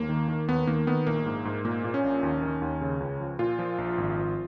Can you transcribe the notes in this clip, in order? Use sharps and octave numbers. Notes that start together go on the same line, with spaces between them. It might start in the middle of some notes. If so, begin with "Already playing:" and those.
Already playing: D#2 A#3
D#3
D#3
D#2 B3
D#3 A#3
D#3 B3
A#1 A#3
G#2
G#2
A#2 A#3
A#2
C#4
A#1
D#2
D#3
D#2
C#3
C#2
F3
A#2 F4
F3
A#1
G#1
F3